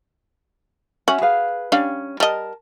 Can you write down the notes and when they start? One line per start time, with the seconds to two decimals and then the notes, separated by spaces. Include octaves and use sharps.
1.08 C#4 F#4 E5 G#5
1.21 G#4 B4 F5
1.72 G3 C#4 D4 F5
2.20 G3 A#4 D#5 A5